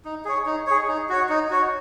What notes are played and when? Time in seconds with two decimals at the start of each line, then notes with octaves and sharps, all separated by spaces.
0.05 D#4
0.25 G#4 C#5
0.46 D#4
0.67 G#4 C#5
0.88 D#4
1.09 F#4 C#5
1.29 D#4
1.51 F#4 C#5